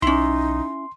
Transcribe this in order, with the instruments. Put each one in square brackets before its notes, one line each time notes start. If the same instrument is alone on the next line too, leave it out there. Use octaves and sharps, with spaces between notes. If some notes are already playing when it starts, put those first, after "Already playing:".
[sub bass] B1 [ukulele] C#4 E4 [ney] D#4 [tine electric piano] C6